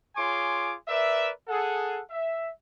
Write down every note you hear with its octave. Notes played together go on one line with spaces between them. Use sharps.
F4 G#4 C#5 G#5 C6 D6
A#4 B4 D5 E5
G#4 A4 F#5
E5